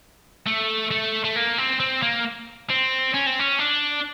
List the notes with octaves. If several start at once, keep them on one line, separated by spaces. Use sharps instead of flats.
A3
A3
A3
A#3
C4
C4
A#3
C4
C#4
C4
C#4
D4